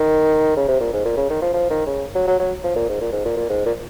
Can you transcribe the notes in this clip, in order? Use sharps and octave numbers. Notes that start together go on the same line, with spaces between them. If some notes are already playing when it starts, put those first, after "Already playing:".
Already playing: D#3
C#3
C3
A#2
G#2
A#2
C#3
D#3
F3
F3
D#3
C#3
F#3
F#3
F#3
F3
A#2
G#2
A#2
G#2
A#2
A#2
G#2
A#2